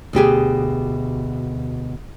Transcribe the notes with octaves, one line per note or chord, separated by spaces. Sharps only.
D2 B2 G4 G#4